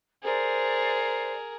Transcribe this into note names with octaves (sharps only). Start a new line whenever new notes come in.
G#4 A#4 C5 D5